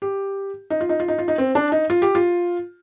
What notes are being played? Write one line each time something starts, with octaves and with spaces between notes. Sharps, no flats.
G4
D#4
F4
D#4
F4
D#4
F4
D#4
C4
D4
D#4
F4
G4
F4